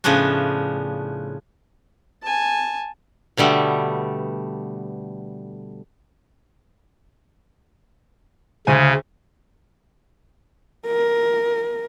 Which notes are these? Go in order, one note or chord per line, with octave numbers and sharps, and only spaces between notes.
A2 C#3 F3 B3 C#4 D4
G#5 A5
B2 D3 G3 A3 B3
D2 C#3 C5 G#5
A#4